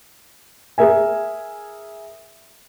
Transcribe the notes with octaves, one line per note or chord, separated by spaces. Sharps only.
G#4 A#4 E5 G#5